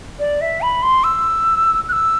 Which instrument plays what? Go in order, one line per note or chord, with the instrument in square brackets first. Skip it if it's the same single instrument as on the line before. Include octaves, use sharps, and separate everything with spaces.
[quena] D5
E5
B5
C6
E6
F#6
E6